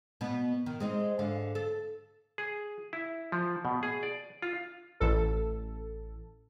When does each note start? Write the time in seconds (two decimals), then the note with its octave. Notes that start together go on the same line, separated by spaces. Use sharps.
0.21 B2 B3
0.66 D#3
0.80 G#3 C4 D#4
1.19 G#2 D3 F5
1.55 A4
2.38 G#4
2.93 E4
3.32 F3
3.65 B2
3.83 G#4
4.03 D5
4.42 F4
5.00 A1 A4